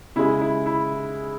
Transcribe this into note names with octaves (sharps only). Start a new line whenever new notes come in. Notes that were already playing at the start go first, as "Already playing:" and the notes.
C#3 G#3 E4
E4
E4